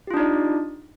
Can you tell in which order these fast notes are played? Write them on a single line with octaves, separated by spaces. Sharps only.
G4 F4 D4 D#4 D5